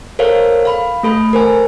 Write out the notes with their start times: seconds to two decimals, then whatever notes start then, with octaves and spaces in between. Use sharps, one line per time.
0.19 A4 A#4 C5 C#5 F5
0.65 F5 B5
1.03 A3 A4 B5
1.33 A#4 C5 G#5